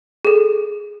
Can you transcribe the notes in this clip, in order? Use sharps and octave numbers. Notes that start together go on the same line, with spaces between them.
G#4 A4